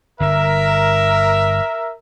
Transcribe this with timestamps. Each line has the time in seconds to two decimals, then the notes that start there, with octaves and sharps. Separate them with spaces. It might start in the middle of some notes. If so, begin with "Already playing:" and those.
0.20 G1 D3 A#4 E5